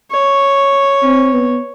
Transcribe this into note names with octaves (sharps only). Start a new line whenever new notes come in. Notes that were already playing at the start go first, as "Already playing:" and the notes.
C#5
C4
B3